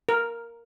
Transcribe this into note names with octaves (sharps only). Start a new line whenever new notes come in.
A#4